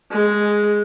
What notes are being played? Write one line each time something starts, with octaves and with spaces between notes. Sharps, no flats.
G#3